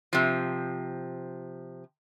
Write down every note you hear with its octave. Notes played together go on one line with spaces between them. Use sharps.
C3 F3